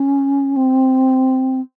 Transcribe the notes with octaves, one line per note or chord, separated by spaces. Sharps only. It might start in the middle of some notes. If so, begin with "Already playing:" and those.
Already playing: C#4
C4